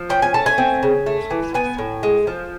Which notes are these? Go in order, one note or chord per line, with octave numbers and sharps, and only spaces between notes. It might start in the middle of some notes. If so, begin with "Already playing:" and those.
Already playing: F3
C#4 G5
G#5
A3 A5
G#5
C4
C#3
A3
E3
B3 G#5
A2
G#3
F3